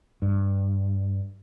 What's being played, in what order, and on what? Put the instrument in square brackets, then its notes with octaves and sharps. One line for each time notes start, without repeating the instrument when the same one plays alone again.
[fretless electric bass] G2